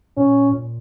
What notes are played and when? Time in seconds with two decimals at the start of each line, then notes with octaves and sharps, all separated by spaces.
0.17 A#2 C#4
0.53 A#2